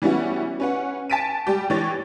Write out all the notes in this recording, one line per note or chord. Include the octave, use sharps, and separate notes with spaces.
E3 G3 B3 C#4 E4 F#4
C#4 B4 F#5
G#5 A5 A6 B6 D7 D#7
G3 G4
E3 G4 C#5 A6 A#6